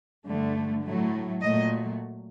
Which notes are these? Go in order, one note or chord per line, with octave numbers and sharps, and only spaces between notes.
G2 D3 A3
A2 F#3 A3
A#2 F#3 A3 D#5